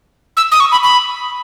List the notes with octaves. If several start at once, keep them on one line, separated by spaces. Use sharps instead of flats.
E6
D#6
C#6
B5
B5